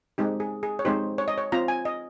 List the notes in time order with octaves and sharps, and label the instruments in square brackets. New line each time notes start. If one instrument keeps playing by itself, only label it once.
[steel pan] G#3 C4 D#4 G4
G#4
G#4
C#5
G#3 C4 D#4 G4 C5
C#5
D#5
C#5
C4 F4 A#5
G#5
D#5